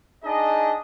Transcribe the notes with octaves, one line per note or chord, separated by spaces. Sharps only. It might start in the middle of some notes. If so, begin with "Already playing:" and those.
D4 D#4 G#4 D#5